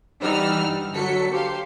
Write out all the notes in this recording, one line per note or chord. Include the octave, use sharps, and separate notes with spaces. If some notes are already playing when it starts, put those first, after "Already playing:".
E3 G3 D#4 F#5 E6 F6
G2
D3 F#3 A4 B6 C#7
G4 C5 F5 C6